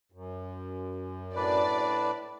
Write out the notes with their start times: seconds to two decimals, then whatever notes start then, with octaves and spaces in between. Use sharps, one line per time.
0.12 F#2
1.36 A2 D4 B4 D5